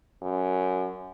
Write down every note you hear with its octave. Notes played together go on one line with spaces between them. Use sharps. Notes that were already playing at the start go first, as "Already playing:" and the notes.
F#2